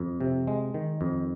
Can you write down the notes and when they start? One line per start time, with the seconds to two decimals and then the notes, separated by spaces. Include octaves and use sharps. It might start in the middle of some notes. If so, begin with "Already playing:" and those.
Already playing: F2
0.21 C3
0.47 G#3
0.74 D#3
1.01 F2